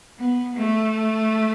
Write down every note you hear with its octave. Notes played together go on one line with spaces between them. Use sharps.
B3
A3